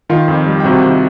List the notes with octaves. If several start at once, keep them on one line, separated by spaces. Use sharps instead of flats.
D#3 F4 F5
F2
G3
G5
C3 F#4 F#5
D#3